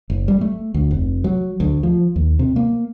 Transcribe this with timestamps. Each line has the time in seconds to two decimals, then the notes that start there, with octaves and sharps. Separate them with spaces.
0.10 F#1
0.28 G3
0.41 A3
0.74 D2
0.91 F1
1.24 F#3
1.60 D2
1.83 F3
2.16 D#2
2.39 C3
2.56 A#3